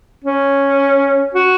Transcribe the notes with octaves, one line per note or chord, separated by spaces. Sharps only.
C#4
F#4